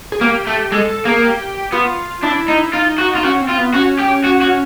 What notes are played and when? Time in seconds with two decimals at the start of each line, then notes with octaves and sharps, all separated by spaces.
0.12 G#4
0.21 A#3 G4
0.47 A3
0.72 G#3 A4
0.89 A4
1.05 A#3 G#4
1.23 G4
1.72 B3 F4
2.23 D4 E4
2.48 D#4
2.73 D#4 F4
2.99 F#4
3.16 F4
3.24 C#4 F#4
3.41 C4
3.49 F4
3.58 B3
3.74 C#4 F#4
4.00 G4
4.25 F#4
4.42 F#4